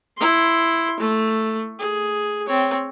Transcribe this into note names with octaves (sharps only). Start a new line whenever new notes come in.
E4 C6
A3
G#4
C4 C#5